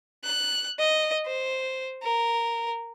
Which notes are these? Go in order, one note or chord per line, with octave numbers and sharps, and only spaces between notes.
F#6
D#5
C5
A#4